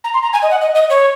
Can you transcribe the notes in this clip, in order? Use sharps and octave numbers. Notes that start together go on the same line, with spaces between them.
A#5
C6
A#5
G#5
D#5
F#5
D#5
D#5
C#5